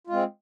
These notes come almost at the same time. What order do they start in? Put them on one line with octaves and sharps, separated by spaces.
F4 G#3 C4